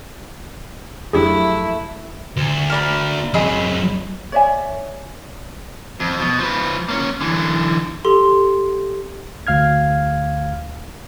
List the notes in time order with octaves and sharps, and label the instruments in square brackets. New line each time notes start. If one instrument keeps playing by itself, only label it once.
[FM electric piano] F2 F3 F#3 [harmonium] A3 [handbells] D4 G4 G#4 [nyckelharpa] E4
[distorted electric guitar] D2
[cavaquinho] A#4 D5 B5
[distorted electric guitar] F2 F#3 [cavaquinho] G#4 D#5 B5
[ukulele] C#5 D5 E5 G#5
[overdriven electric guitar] F2
B2
F3 B4
A#3 C#4
D3 E3
[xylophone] G4 A4 C6
[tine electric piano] D2 F5 F6 G#6